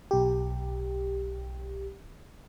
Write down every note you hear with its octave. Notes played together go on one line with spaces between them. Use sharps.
B1 G4